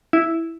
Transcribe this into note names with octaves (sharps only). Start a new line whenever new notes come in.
E4